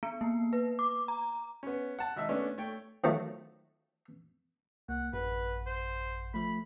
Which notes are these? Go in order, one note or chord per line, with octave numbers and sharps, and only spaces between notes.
B3
A#3
B4
D6
A#5
B3 C#4
F#5 A5
G#1 D#4 E5 E6
A3 B3 C#4 D4
A3 C#5 G5
D#3 F3 F#3 A3
C2 A#3 F#5
A1 F#2 B4 F#5
C5
F3 A3 B5